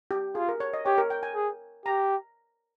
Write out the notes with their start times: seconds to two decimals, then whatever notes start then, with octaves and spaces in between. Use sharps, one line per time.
0.11 G4
0.35 F4 G#4
0.48 A#4
0.60 C#5
0.73 D#5
0.86 G4 C#5
0.98 A#4
1.10 G5
1.23 G#5
1.35 G#4
1.86 G4 A#5